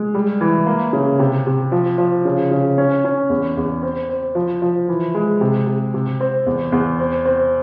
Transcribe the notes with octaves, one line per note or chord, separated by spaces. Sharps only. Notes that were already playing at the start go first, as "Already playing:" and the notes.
Already playing: G#3
G3
E3
A#3
C#3
C3
C3
F3
F3
C#3
C#3
C#4
C#4
E2
E2
C4
C4
F3
F3
E3
G#3
C3
C3
C3
C4
E2
E2
C4
C4